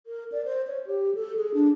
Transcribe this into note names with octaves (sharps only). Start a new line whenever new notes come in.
A#4
D5
C5
C#5
G4
A4
G#4
D4